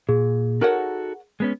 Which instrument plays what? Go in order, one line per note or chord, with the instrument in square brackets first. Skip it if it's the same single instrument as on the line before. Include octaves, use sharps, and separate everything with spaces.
[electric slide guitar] A#2 [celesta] G#4
[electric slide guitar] D#4 F#4 A4 [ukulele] A#4 C#5 F#5
[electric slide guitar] G#3 B3 C#4